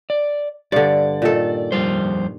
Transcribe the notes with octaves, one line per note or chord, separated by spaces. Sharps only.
D5
G2 D3 D5
A#2 D#3 A4
F2 G3 C5